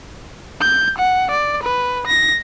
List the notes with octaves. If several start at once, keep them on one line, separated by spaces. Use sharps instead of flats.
G6
F#5
D5
B4
A#6